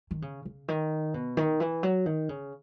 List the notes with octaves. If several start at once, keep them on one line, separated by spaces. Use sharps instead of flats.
D#3
C#3
C#3
D#3
B2
D#3
E3
F#3
D#3
C#3